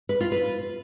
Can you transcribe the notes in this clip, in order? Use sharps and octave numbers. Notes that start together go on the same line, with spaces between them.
B4
F4
B4